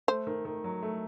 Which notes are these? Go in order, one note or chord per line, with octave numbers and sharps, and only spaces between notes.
A3 C5
D#3
D#3
F#3
A3